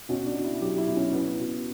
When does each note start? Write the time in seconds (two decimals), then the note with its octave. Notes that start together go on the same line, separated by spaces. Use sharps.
0.09 B2 C#4
0.26 D4
0.35 B2
0.44 E4
0.61 F#3 G4
0.78 E4
0.87 B2
0.96 C#4
1.08 C#4
1.13 B3 E4
1.39 B2